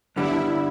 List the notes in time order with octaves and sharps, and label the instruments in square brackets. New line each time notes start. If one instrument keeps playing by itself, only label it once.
[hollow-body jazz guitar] G2 D3 G3 B3 D4 [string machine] E4